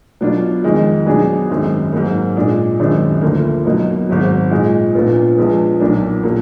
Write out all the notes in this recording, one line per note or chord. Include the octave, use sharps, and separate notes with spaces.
B2 F#3 D4 F4
F2 D#3 G#3
B2 F#3 D4 G#4
G#1 F#2 D#3 G#3
G#2 F#3 A#3
A#2 G#3 D4
G#1 F#2 D#3 G#3 D4
D2 D3 F3 A#3
B2 F#3 A#3 D#4
G#1 G#2 F#3
A#2 G#3 D#4
A#1 A#2 F3 B3 F4
A#1 A#2 G#3 B3
B1 A#2 F#3 A#3 D4
A#2 F#3 A#3